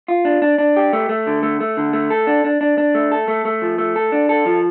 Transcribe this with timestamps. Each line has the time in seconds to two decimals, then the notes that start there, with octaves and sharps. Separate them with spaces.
0.08 F4
0.25 D4
0.42 D4
0.58 D4
0.76 G4
0.93 A3
1.09 A3
1.27 D3
1.43 A3
1.60 A3
1.77 D3
1.93 A3
2.10 A4
2.27 D4
2.44 D4
2.61 D4
2.78 D4
2.95 A3
3.12 A4
3.28 A3
3.45 A3
3.62 F3
3.78 A3
3.96 A4
4.12 D4
4.29 A4
4.46 F3